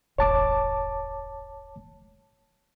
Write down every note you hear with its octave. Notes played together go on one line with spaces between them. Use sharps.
D#1 G#1 C#5 A5 D6